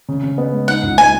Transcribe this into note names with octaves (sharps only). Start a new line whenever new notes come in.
C#3
C#3
B3
G#3
D#4 F#5
C#2
G#3 G#5